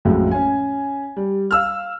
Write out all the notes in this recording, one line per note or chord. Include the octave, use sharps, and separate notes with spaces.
A1 F2 A2 F#3 G#3
C#4 G#5
G3
F5 E6 F6